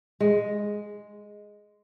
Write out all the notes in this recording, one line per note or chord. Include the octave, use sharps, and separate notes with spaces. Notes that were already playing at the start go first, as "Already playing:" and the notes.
G#3